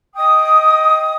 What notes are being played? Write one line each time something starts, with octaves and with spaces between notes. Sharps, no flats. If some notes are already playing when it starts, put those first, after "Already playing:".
D#5 G5 D#6